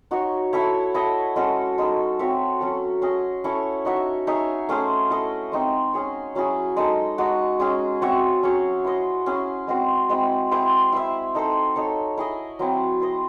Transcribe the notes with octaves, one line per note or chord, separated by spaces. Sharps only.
D#4 F#4 C#5
E4 A4 C#5 E5
E4 A4 D#5
G#3 C#4 F#4 A4
G#3 D#4 A4
C4 F#4 C#5 E5
F#3 C#4 F#4 A4
C#4 G#4 D#5
C#4 E4 A4 C#5
D#4 F#4 C#5 E5
D#4 G#4 C#5 E5
A3 C#4 G#4 C5
E4 A4 D#5
G#3 C4 D#4
C#4 G#4 C#5
F#3 C#4 E4 G#4
G#3 D#4 A4
G#3 D#4 F#4
G#3 C#4 G#4
C4 F#4 C#5 E5
F#3 C#4 G#4 C#5
E4 C5 D#5
C#4 E4 G#4 C5
G#3 C4 F#4 C5
G#3 C4 E4
C4 E4 G#4 C5
E4 C5 E5
D#4 A4 C5
D#4 A4 C#5
E4 G#4 D#5
F#3 C4 E4
E4 C5 D#5